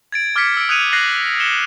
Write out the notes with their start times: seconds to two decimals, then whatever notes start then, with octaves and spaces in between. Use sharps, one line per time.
0.12 G#6 A6 D7
0.36 D6 F6 G#6 A6 B6 C#7
0.57 E6 D7
0.69 D#6 F#6 G#6 C#7 D#7 F7
0.93 F#6 A6 A#6 C7 D#7 F#7
1.40 C#7 E7 G7